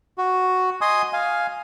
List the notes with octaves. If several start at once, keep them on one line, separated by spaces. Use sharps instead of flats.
F#4
D#5 G#5 C6 D#6
F5 G#5